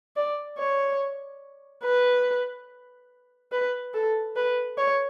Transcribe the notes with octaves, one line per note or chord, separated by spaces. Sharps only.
D5
C#5
B4
B4
A4
B4
C#5